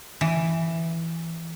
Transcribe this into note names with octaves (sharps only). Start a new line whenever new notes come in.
E3